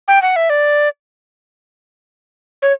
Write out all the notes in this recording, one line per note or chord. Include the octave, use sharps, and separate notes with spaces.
G5
F#5
E5
D5
C#5